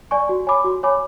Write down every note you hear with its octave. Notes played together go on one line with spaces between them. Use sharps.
D5 G#5 C#6
F#4
C#5 G#5 B5 D6
F#4
C#5 G#5 B5 D6